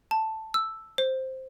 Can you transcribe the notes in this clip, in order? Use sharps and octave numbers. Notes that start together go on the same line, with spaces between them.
A5
E6
C5